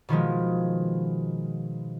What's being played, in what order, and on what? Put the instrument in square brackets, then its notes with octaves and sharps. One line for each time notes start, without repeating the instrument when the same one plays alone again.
[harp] B2 D#3 F3 G#3